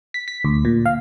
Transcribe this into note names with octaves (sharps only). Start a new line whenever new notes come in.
B6
B6
D2
A#2
F5